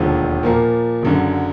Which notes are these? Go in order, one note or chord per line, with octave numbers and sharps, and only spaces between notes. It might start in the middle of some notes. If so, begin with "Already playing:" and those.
Already playing: E1 D#2 D3 F3
A#2 F3 A#3
F#1 F#2 D3